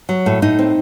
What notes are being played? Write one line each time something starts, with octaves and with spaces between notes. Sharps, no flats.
F#3
A2
A2 D#4
C4